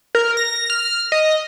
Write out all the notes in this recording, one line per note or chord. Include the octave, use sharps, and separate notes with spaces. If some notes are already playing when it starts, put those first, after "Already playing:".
A#4
A#6
F6
D#5